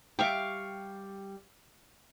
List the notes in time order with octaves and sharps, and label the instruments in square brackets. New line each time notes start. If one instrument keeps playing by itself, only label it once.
[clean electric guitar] G3 G4 [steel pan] E5 G5 [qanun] F5 C#6 D6